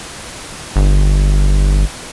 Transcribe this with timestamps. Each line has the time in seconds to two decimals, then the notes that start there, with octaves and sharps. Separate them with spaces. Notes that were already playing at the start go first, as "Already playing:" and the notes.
0.76 G1